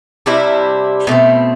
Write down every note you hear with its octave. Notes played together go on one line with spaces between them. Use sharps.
C3 G3 D4 E4
B2 A3 C4